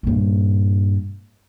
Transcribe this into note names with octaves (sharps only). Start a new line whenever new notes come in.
G2 A#2